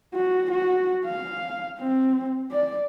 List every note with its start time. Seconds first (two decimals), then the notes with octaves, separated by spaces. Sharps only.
0.14 F#4
0.51 F#4
1.06 F5
1.79 C4
2.52 D5